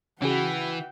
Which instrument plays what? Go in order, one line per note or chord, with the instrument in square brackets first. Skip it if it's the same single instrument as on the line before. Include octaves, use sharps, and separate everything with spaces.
[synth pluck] C#3 F#4 [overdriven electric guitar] E3 [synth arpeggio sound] C#4 G#4 [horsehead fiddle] F#5 G5